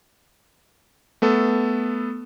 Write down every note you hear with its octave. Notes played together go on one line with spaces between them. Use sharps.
A3 B3 A4